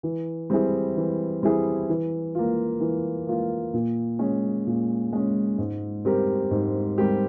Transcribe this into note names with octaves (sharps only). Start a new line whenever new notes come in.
E3
G3 C4 E4 G#4
E3
G3 C4 E4 G#4
E3
A#3 F4
E3
A#3 F4
A#2
G#3 C#4
A#2
G#3 C#4
G#2
G3 C4 G4 A#4
G#2
G3 C4 G4 A#4